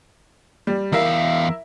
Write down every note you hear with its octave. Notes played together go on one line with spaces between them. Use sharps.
G3
E2 E4 A#4 E5 F5